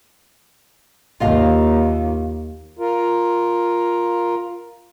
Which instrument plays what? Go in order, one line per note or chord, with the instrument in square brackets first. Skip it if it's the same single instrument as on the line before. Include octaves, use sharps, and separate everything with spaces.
[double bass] D#2 [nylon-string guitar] F4 D#5 F5
[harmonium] F4 A#4